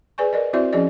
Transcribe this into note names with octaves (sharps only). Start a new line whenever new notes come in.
G#4 B4 D5 G#5 C#6
A#4 D5 D#5
C4 E4 F#4 C5 D5 E5
F3 C#4 G#4 D5 D#5